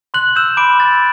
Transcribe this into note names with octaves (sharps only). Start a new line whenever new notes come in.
C6 F#6 F#7
E6 G6 E7
B5 D6 D7
D6 F#6 A6